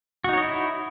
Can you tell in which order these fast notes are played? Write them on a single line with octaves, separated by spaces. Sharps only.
F#4 D#4 C#5 D#5 E4